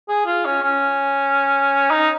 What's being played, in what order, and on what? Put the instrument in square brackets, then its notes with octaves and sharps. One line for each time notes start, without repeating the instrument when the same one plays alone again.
[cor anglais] G#4
F4
C#4
C#4
D#4